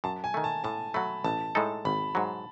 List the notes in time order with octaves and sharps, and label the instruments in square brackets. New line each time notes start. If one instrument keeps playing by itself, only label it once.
[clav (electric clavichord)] F#2 [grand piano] A5
[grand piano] G#5
[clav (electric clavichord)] D#3 A3
[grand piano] A5
[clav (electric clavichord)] A2 [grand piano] A5
[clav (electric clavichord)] F#3 A3 [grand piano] B5
[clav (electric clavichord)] A1 [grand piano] A5
[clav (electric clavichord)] A2 G#3 D#4 A4
[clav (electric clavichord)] G#1 [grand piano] B5
[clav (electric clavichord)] G#2 F#3